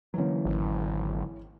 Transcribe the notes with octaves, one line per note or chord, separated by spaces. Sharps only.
D3 E3 F#3 A#3 C#4
G#1